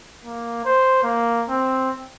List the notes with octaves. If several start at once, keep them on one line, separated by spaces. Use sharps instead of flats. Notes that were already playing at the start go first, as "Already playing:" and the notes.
A#3
C5
A#3
C4